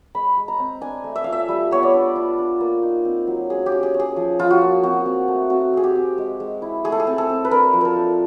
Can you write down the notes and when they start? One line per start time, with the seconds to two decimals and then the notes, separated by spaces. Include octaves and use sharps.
0.15 G#3 B5
0.37 G#3
0.48 A#5
0.59 C4
0.81 D4 G#5
1.04 A3
1.16 E5
1.24 F4 F5
1.32 E5
1.48 G3
1.71 B3 C#5
1.83 D5
1.94 D4
2.16 F4
2.38 D4
2.60 A#3
2.83 D#4
3.05 C4
3.27 F#3
3.50 C#4 G#4
3.66 G4
3.72 C#4
3.83 G#4
3.94 C#4
4.00 G#4
4.16 F3
4.39 F3 F4
4.50 F#4
4.61 A#3
4.83 C4 F#4
5.06 C4
5.28 A3
5.50 C4 F#4
5.73 C4 G#4
5.84 G4
5.95 C4
6.18 G#3
6.40 G#3
6.62 E4
6.84 A3 G#4
6.92 A4
7.00 G#4
7.07 C4
7.18 A4
7.30 C4
7.45 B4
7.51 D4 A#4
7.73 F3
7.81 A4 A#4
7.96 D4